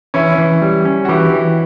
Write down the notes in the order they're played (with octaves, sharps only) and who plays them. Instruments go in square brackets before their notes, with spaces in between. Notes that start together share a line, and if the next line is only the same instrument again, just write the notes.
[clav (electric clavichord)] E3 [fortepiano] C#4 E4
[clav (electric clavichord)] E3
G3
C#4
[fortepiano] F#4
[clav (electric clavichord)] E3 [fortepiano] E4 G4
[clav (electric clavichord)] E3